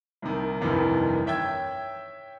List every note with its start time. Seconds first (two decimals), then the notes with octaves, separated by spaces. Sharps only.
0.22 C2 C3 D#3
0.61 F1 C2 G2 C3 D#3 E3
1.26 C#5 E5 G5 E6 G#6